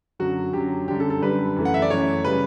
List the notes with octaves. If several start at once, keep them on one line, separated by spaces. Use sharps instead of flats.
F#2 D3 F#3 F#4
F#2 D3 F#3 G4
F#2 D3 G3 G4
A4
A4
F#2 D3 G3 B4
F#2 E3 A3
F#5
E5
D5
F#2 E3 A3 C#5
C#3 G3 B4